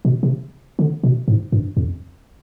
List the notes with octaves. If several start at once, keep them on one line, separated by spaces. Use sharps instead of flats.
B2
C3
D3
B2
G#2
G2
F2